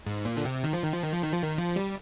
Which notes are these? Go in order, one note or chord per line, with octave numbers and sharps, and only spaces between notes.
G#2
A#2
D3
C3
D#3
F3
D#3
F3
D#3
F3
D#3
F3
D#3
F3
G3